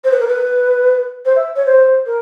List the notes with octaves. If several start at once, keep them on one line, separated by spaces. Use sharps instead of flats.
C5
B4
A#4
B4
C5
E5
C#5
C5
A#4